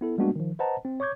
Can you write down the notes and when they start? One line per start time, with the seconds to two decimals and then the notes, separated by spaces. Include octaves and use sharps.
0.01 B3 E4 A4
0.18 G3 G#3 A#3 B3 D4 F#4
0.36 D#3 F3
0.59 B4 C5 D#5 F#5 A5 A#5
0.85 C4
1.00 C#5 C#6 D6 G6 G#6